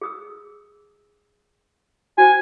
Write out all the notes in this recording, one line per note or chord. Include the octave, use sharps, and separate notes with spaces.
G#4 D#6 E6
F#4 C5 G5 G#5